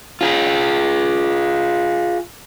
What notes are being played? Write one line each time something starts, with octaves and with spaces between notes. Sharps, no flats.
F4 G#4